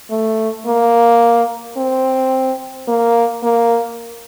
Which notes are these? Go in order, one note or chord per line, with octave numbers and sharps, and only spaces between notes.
A3
A#3
C4
A#3
A#3